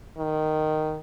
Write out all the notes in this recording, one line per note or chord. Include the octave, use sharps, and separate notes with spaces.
D#3